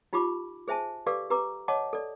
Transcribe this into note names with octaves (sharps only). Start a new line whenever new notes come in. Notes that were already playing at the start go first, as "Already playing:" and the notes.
D#4 F4 G4 B5 D6
G#4 C5 E5 G#5 A5
G4 A4 B4 D5 F5 D6
G4 B4 A#5 D6
C#5 D#5 F#5 A5 D6
A4 D5